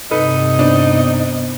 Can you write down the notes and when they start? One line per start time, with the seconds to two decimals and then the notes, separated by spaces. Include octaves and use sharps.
0.11 G2 C3 D#4 A4 B4
0.59 B3 D4 C5